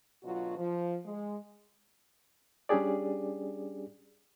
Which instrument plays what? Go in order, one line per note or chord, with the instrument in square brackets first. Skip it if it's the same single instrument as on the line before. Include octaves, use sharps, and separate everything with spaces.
[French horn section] D2 B2 F#3 F4 F#4
F3
G#3
[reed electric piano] G3 C#4 D4 G4 G#4 D5